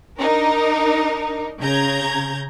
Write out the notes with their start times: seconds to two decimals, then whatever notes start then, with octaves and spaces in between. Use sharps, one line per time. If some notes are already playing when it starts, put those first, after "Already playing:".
0.18 D4 D#4 A#4
1.61 C#3 A#5 G6 G#6